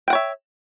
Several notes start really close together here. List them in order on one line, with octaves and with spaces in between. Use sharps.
G5 F#5 C#5 E5